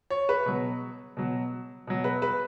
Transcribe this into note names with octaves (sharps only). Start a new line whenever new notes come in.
C#5
B4
B2 F#3
B2 F#3
B2 F#3
B4
B4